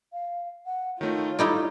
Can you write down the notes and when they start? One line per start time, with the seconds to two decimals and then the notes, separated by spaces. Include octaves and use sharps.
0.13 F5
0.66 F#5
1.01 D#3 A3 D#4 F4 C#5
1.39 G3 D#4 E4 A4 C#5 D5